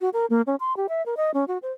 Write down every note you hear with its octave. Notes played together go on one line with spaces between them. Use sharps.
F#4
A#4
A#3
C#4
C6
G4
E5
A#4
D#5
C#4
F#4
C5